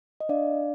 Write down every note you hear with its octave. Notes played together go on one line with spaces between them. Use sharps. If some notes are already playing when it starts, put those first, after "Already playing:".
D#5
D4 D5 F5